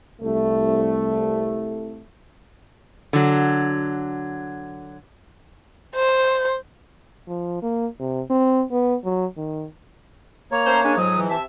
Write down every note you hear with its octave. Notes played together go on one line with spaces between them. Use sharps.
C2 A3
D3 F#3
C5
F3
A#3
C3
C4
B3
F#3
D#3
A#3 C#5 A#5
A3 C#4 C5
G#3 C#4 D4 G#5
F2 G#2 F#3 D#6
E3
C3 E5 A5